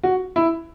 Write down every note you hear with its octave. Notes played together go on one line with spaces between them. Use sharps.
F#4
E4